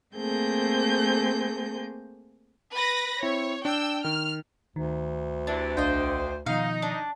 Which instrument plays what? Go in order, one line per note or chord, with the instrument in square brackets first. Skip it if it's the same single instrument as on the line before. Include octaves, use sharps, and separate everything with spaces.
[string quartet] A3 A#3 C4 G#4 G6
[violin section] B4 B5 A#6
[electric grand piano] C4 E4 [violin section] C#5
[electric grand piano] D4 [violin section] G5 E6
[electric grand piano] D#3 [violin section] F6
[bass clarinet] D2 [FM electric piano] D#3
[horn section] C3 E3 [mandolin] D4
[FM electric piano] B1 D4 F5 [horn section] D3 C5 [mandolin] D#5 G5
[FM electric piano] B2 D#3 F3 [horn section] D#4 [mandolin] F5
[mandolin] D4